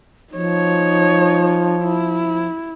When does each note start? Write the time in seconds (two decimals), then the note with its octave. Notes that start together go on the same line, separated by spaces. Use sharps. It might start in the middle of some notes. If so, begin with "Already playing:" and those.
0.33 F3 D#4 C#5
1.83 E4